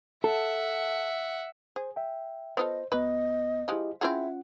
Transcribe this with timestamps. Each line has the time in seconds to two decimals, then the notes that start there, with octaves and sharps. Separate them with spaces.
0.24 A4 E5 F#5
1.76 G#4 C5
1.96 E5 G5
2.57 B3 F4 A4 C5 D#5
2.92 C#2 F#3 B3 B4 D#5
3.68 F3 G#3 E4 G4 D#5
4.01 C4 C#4 E4 F4 G#4 E5 F#5